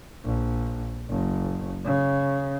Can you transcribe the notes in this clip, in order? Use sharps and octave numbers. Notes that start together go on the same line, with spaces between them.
A#1
F#1
C#3